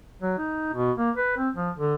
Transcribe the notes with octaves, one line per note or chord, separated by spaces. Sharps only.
F#3
D#4
B2
A#3
B4
C4
F3
D3